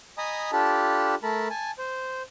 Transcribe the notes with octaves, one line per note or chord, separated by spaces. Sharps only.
D#5 G#5 A#5 B5 D#6
D4 F4 G4 A4 A5 B5
A3 A#4 A5 B5
G#5 A5
C5